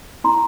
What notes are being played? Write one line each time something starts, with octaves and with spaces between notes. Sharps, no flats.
E4 A#5 C6